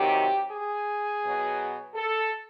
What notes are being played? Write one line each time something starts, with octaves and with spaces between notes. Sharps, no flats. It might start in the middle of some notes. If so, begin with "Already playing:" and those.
Already playing: C3 D#3 F#3 G4
G#4
B2 F#3
A4